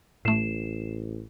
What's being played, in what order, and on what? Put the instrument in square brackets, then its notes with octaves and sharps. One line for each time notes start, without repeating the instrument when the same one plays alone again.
[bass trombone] A1 [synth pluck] A2 A3 [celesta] C7 E7